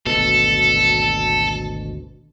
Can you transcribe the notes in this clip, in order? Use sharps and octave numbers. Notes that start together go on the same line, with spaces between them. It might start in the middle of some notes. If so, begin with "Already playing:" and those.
G#1 D2 B2 A4